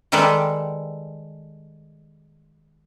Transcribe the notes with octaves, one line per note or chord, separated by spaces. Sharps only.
D#3 G3 G#3 A4 B4 D5